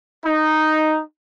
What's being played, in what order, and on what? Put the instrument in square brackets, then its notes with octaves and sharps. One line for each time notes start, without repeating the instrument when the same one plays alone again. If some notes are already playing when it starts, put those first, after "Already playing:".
[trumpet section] D#4